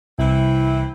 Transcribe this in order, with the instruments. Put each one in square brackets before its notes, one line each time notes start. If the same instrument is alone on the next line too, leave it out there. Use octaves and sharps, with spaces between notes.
[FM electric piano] C2 [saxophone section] E3 C4 E4